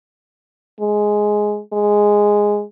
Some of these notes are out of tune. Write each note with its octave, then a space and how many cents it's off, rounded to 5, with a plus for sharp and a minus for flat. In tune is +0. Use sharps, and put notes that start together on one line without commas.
G#3 +5
G#3 -5